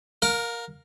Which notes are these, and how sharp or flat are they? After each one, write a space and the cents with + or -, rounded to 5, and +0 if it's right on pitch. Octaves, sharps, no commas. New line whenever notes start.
A#4 +0 F5 +30